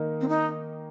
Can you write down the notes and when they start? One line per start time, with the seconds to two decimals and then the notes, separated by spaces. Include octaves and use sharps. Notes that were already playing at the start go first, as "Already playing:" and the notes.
Already playing: D#3 A#3 D#4
0.21 C4
0.28 D#4